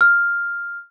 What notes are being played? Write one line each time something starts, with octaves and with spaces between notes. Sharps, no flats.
F6